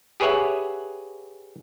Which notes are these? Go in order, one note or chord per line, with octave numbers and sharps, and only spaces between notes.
G4 G#4 B4 C#5 E5 F#5